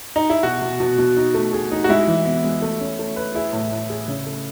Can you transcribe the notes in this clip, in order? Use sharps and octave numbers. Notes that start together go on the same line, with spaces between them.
D#4
E4
B2 F#4
B2
B2
B2
D#4
A3
G#4
D#4
F#4
G#3 E4
E3
B3
G#3
A3
C#4
A3
B4
E4 G#4
A2
A2
G#4
C#3
A3